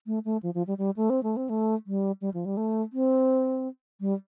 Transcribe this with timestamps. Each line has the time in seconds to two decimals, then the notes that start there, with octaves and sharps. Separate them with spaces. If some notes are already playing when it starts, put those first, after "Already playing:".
0.06 A3
0.25 A3
0.43 F3
0.54 F3
0.67 G3
0.78 G3
0.96 A3
1.10 C4
1.23 A3
1.36 C4
1.49 A3
1.87 G3
2.21 G3
2.34 F3
2.45 G3
2.57 A3
2.93 C4
4.00 G3